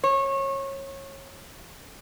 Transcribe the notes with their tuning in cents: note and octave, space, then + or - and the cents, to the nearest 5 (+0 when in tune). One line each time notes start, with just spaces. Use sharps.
C#5 -25